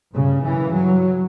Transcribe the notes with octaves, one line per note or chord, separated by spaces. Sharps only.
G2 C#3
F#2 C#3 E3
G2 F#3